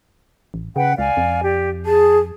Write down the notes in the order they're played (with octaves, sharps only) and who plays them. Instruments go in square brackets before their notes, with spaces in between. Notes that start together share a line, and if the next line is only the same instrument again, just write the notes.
[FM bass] A1
[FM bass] C#3 [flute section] B4 F#5 G5
[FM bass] C#2 [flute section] D5 F5 G#5
[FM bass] F2
[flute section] G4 D5
[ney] G#4 [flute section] A5